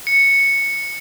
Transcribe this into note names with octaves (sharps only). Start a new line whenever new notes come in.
C#7